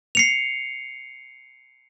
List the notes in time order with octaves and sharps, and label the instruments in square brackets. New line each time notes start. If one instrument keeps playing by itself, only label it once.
[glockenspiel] C7 C#7 F7